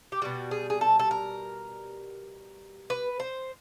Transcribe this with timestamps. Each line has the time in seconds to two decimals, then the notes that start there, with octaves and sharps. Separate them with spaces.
0.12 G4
0.22 B2 G3 F#4
0.51 G#4
0.70 G#4
0.81 A4
0.99 A4
1.11 A#4
2.90 B4
3.20 C5